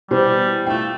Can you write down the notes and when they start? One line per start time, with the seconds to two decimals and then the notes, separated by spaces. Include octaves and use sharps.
0.11 B2 E3 G3 G4 C5
0.67 A3 E4 F4 G5